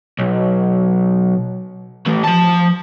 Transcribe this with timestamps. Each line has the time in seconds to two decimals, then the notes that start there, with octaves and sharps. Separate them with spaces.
0.19 B1
2.07 A2 E3
2.24 F3 A5